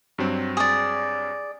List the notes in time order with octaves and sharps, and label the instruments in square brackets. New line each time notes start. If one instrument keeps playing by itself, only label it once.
[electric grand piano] G2 F#3 C4
[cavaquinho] G#4 D5